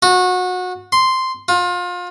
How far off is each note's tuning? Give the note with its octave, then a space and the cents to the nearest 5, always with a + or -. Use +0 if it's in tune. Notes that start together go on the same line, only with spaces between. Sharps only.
F#4 -25
C6 -5
F4 +30